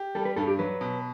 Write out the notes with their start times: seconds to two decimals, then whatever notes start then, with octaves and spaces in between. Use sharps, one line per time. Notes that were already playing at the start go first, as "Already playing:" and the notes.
Already playing: G4
0.15 G3 A4
0.25 B4
0.36 G2 A4
0.47 G4
0.59 F#3 B4
0.81 B2